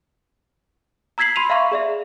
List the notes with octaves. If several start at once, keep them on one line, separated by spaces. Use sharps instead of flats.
A#5 E6 G#6 B6 C7 F#7
B5 C6 D#7 F7
E5 F5 A#5 C6 C#6
G#4 D5 E5